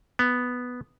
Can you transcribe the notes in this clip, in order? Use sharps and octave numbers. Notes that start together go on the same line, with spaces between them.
B3